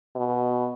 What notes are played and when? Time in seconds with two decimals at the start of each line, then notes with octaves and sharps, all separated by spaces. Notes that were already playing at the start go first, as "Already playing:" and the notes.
0.16 B2